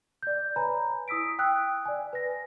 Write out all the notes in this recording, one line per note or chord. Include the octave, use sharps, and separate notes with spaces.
D5 G6
B4 C#5 G#5 A#5 B5
E4 D#6 E6 B6 D7
G5 D#6 E6 F#6
D5 G#5
B4 A#6